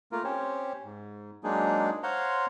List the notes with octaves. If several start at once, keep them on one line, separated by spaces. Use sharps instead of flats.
A3 A#3 F4 A#4
C4 C#4 G4 C5 C#5
G#2
F#3 G#3 A#3 D4 D#4 G#4
C5 C#5 F5 F#5 A#5 C6